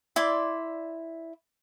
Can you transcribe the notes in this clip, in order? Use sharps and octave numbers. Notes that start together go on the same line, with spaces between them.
E4 D5 C6 D6